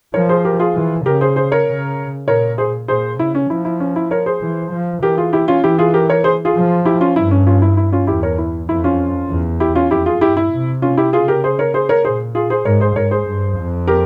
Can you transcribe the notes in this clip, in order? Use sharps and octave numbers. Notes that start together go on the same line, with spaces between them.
F3 A#4 C#5
G#4 C5
G4 A#4
F4 G#4
E3
C#3 G4 A#4
G#4 C5
G#4 C5
A#4 C#5
C#3
A#2 A#4 C#5
G#4 C5
A#2 G#4 C5
C#3 E4
C#4
F3 E4
E4
C#4
E4
A#4 C#5
G#4 C5
E3
F3
E3 G4 A#4
F4 G#4
E4 G4
C#4 F4
E3 E4 G4
F4 G#4
G4 A#4
A#4 C#5
G#4 C5
F4 G#4
F3
E4 G4
C#4 F4
G2 E4
C#4
C#4 F4
E4
E4
C#4 F4
E2 E4 G4
A#4 C#5
E4
F2 E4
C#4 F4
E2
E4 G4
C#4 F4
F2 E4 G4
F4 G#4
G2 E4 G4
E4
C3
C#4 F4
E4 G4
C#3 F4 G#4
G4 A#4
G#4 C5
A#4 C#5
G#4 C5
A#4 C#5
A#2 G#4 C5
F4 G#4
G#4 C5
G#2 A#4 C#5
G#4 C5
G#2 A#4 C#5
G#4 C5
G2
F2
G4 A#4